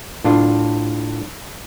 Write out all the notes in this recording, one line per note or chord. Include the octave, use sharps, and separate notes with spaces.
A2 D4 F4